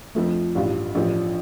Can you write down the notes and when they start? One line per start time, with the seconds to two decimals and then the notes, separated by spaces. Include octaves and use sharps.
0.15 F2 F3 A3
0.55 A1 G2 G3 F4
0.95 A1 A2 F3 D4 G4